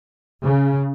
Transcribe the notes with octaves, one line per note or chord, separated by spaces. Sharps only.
C#3